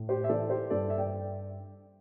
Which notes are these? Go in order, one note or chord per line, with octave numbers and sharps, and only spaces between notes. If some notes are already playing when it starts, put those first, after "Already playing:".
Already playing: A2
G4 C5
E5
E3 A4 D5
G4 C5
G2 A4 D5
E5
D5 G5